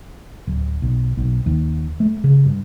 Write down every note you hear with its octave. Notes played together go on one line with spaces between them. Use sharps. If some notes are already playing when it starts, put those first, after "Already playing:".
D1
B1
B1
D#2
A3
C#3
G2